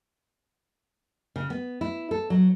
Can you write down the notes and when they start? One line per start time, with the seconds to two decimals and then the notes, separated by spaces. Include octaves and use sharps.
1.36 C#3
1.50 B3
1.81 E4
2.11 A4
2.30 F#3